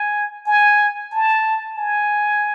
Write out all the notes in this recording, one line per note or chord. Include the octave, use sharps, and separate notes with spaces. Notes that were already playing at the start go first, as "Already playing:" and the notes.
Already playing: G#5
G#5
A5
G#5